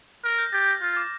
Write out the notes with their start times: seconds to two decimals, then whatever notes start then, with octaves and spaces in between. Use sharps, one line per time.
0.24 A#4 F6
0.38 G6
0.46 A#6
0.53 G4 A6
0.68 A#6
0.81 F4
0.97 D6